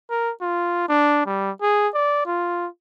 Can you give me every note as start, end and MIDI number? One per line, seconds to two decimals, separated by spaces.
0.10 0.31 70
0.41 0.87 65
0.89 1.24 62
1.26 1.51 55
1.62 1.88 68
1.94 2.26 74
2.26 2.68 65